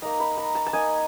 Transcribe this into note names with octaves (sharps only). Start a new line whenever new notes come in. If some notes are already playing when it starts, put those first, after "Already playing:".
A#3 D#4 A#5
B5
A#5
A5
A5
A#3 D#4 G#5